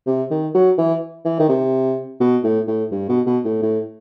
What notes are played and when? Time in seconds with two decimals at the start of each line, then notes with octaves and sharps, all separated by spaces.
0.07 C3
0.31 D#3
0.54 F#3
0.78 E3
1.25 E3
1.39 D#3
1.49 C3
2.20 B2
2.43 A2
2.68 A2
2.92 G2
3.09 B2
3.26 B2
3.45 A2
3.62 A2